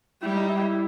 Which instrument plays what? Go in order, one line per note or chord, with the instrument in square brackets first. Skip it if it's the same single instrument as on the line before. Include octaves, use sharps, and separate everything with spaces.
[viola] G3 [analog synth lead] E4
[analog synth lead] D#4
E4